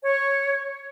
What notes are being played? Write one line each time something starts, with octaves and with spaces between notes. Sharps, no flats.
C#5